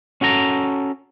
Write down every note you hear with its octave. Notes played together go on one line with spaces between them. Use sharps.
C#4 F#4 A4 A#5